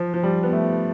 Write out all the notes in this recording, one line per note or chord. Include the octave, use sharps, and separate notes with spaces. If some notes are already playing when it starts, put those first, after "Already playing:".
Already playing: F3
F3
G3
B3
A3